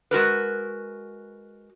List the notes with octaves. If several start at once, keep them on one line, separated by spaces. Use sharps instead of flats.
G#3 F#4 A#4 B4